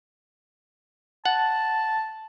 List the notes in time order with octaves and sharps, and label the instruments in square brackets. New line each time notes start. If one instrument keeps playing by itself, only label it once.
[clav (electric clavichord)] F#5 [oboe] A5